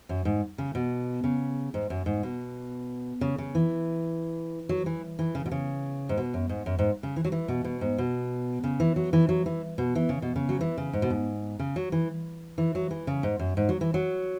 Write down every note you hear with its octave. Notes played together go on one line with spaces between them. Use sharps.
F#2
G#2
C#3
B2
C#3
G#2
F#2
G#2
B2
C#3
C#3
E3
F#3
E3
E3
C#3
B2
C#3
G#2
B2
F#2
G#2
F#2
G#2
C#3
E3
F#3
E3
B2
B2
G#2
B2
C#3
E3
F#3
E3
F#3
E3
B2
E3
C#3
B2
C#3
F#3
E3
C#3
G#2
B2
G#2
C#3
F#3
E3
E3
F#3
E3
C#3
G#2
F#2
G#2
F#3
E3
F#3